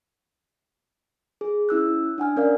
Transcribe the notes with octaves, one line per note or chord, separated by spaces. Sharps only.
G#4
C#4 E4 E6 F#6
D4 F#5 G#5 F6
C#4 A#4 D5 F5